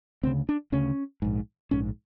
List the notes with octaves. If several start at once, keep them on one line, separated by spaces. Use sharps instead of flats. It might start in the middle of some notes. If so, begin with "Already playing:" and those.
D2 C#3 C4
D4
D2 C#3 C#4
A#1 G#2
A#1 G#2 C#4